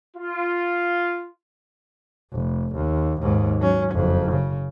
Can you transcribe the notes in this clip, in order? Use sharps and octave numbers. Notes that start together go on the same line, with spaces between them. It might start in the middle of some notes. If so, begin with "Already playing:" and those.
F4
F1
D#2
D#2 G#2
F#3 C#4
F#1 F2
C#3